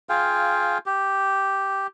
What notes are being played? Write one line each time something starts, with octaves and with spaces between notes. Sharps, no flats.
F4 G#4 F5 G5
G4